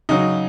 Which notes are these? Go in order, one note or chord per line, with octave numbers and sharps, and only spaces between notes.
C#3 F#3 D#4